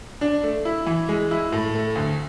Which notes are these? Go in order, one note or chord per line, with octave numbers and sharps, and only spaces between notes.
D4
A3
E4
E3
G#3
E4
A2
A3
D2